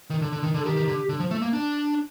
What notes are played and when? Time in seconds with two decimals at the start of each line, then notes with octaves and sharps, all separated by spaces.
0.10 D#3
0.21 D3
0.32 D3
0.43 D#3
0.54 D3
0.59 A4
0.65 D#3 G4
0.76 D#3
0.87 D3
1.09 D3
1.20 F3
1.31 A3
1.42 A#3
1.53 D4